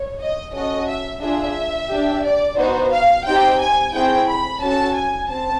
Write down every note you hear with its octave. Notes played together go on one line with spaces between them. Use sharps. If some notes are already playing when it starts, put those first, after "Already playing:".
Already playing: C#5
D#5
C#4 F#4 A4 D#5
E5
D4 F4 G#4 E5
D4 G4
D5
B3 D#4 F#4 C5
F5
C4 D#4 G4 G5
G#5
A3 C4 E4 G#4 G5
B5
C#4 F#4 A4 A5
G#5
C4 A5